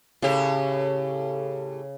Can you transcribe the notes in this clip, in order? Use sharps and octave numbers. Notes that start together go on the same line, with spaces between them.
A2 C#3 G4